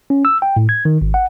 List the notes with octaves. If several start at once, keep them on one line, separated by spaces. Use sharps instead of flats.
C#4
E6
G5
A2
G#6
D#3
G#1
F#5